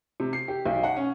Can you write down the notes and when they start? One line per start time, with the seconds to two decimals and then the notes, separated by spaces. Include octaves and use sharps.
0.20 C3
0.33 C7
0.48 G4
0.66 B1
0.83 F#5
0.96 C#4